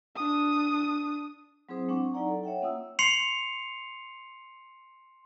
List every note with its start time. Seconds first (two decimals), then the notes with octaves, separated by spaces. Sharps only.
0.16 D4 D#6
1.69 F#3 C4 E4 G#4 C5 D#6
1.88 G#3 C4 D4 F#5 C#6 D6
2.14 F#3 D#4 E4 D5 F#5 A#5
2.28 A4
2.43 C#5 E5 F#5 G5
2.62 A#3 C#4 F4 F#5 D#6 E6
2.99 C6 C7 C#7 F7